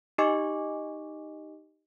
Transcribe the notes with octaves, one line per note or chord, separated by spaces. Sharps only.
D#4 G4 D#5 G#5 C#6 D6